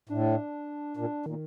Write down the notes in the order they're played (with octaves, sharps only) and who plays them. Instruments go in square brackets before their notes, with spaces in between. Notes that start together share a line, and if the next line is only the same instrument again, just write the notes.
[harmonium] A2 [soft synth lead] D4
[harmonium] A#2 [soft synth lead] D4
[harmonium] A#2 [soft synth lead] D#3